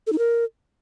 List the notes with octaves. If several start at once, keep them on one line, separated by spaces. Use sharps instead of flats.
A4
D#4
A#4